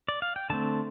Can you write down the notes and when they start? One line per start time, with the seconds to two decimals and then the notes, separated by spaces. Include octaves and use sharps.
0.08 D5
0.22 F5
0.36 G5
0.50 D3 A3 C4 A5